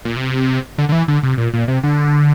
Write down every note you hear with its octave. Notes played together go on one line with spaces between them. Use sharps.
A#2
C3
D3
D3
E3
D3
C3
A#2
A#2
C3
D3